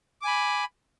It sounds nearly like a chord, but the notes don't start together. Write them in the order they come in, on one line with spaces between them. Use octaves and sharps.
D6 G#5 B5